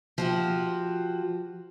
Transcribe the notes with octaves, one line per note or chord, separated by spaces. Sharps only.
F3 F#4 G4